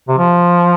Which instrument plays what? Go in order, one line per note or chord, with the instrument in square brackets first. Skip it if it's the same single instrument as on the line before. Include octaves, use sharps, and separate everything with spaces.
[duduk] C3
F3